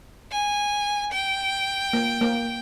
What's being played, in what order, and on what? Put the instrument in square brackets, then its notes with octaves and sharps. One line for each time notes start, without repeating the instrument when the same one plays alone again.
[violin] G#5
G5
[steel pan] A#3
A#3